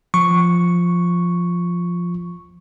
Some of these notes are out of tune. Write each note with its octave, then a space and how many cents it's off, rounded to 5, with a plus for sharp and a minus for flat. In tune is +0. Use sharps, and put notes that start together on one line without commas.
F3 +0 C#6 +0